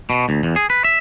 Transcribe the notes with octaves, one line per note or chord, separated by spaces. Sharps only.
B2
D2
E2
G#4
B4
E5